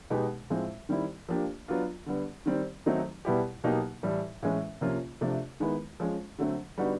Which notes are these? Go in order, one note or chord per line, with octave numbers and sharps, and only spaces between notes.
B2 G#3 B3 D#4 G4
A2 F3 G#3 C4
D#3 G3 C4 E4
F3 A#3 D4 G4
F#3 B3 D4 F4
D3 G3 B3
D#3 G3 C4
D#3 F#3 A3 C4 D#4
B2 G3 B3 E4 G4
B2 F#3 A#3 D#4 G4
A2 E3 G3
A2 E3 G#3 C#4
C3 F3 A#3 C#4 F4
C3 F3 A3 D4
D#3 G#3 B3 E4
F3 G#3 C#4
D3 F#3 A3 C4
D3 G3 B3 D#4 F#4